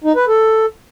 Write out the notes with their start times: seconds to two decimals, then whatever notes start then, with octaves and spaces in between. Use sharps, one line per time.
0.04 D#4
0.16 B4
0.28 A4